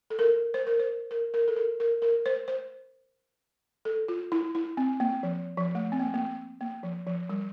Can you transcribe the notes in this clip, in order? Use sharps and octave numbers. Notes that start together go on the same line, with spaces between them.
A4
A#4
C5
A#4
C5
A#4
A#4
A4
A#4
A#4
A#4
C5
C5
A4
F4
E4
E4
C4
A#3
F3
F3
A3
C4
A#3
A3
A#3
A#3
F3
F3
G3